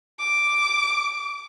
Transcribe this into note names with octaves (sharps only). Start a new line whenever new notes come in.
D6